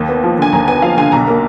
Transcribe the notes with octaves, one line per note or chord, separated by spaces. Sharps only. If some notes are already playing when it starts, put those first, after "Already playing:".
Already playing: D#2
B3
F3
D3 G#5
D#2 A#5
B3 G#5
F3 F5
D3 G#5
B1 A#5
A#3